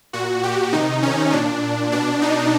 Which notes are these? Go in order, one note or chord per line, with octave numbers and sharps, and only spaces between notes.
A#2 F#4
G4
C3 D#3 D#4
C#4
A#2 D4
B2 D4
D#4